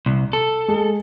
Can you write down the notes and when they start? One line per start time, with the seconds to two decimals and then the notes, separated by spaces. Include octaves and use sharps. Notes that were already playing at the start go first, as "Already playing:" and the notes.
0.06 C2
0.33 A4
0.68 G#3